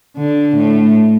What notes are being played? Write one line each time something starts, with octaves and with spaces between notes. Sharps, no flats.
D3
A2